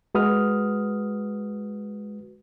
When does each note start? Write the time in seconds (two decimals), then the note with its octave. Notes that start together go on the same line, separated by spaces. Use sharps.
0.15 G#3 F#4 B4 D#6 F6